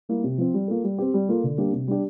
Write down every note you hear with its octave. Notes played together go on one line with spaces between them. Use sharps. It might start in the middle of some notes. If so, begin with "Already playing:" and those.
G3 A#3 E4
C3
F3 C4
G3
A#3 F4 A4
G3
C4 G4
G3
A#3 F4 A4
D3
G3 A#3 D4 G4
C3
G3 D4 G4